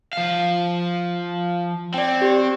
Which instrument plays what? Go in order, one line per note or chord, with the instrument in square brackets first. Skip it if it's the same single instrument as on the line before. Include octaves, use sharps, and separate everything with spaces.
[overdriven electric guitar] F3 F5
[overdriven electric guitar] C4 [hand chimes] D5 G5
[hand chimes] G4 C5